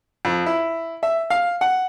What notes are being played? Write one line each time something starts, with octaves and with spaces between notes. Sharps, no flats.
F2
E4
E5
F5
F#5